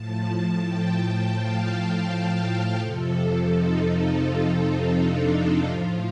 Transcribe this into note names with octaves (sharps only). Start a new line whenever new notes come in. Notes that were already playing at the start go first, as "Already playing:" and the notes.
Already playing: A2 F3 A5
G5
F5
F2 C3 F3 A4
D#4
F4
D#4
D4
D#4
A2 F3 F4